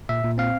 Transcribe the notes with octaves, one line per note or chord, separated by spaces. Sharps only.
A#2 E5
A#2
C4 F5